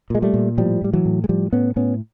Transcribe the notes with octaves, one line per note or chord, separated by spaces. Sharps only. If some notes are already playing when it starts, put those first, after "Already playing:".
A#2 G#3
G3 A3
A#2
A2 F3 G3
A2 G3
E3 F#3
A2
G#3
A2 F3 G3
A2 B3 C#4
A2 B3 C#4